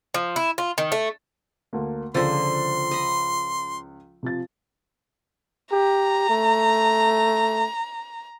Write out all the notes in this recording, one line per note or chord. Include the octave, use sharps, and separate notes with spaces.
F3
E4
F4
D#3
A3
D2 A3 A#3
C#2 D3 F3 C6 E6 A6
D#5 B5
C3 F3 A6
G4 A#5
A3